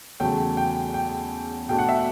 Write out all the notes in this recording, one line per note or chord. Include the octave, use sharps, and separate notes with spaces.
E2 C#3 F#3 A3 G5
G5
G5
B2 A3 D4 G5
F#5
E5